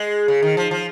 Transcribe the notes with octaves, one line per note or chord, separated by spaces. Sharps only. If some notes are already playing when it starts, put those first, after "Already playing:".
Already playing: G#3
C#3
D#3
F3
F3